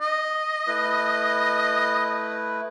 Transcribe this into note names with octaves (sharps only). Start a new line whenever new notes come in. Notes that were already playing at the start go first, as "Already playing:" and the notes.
D#5
A3 E4 B4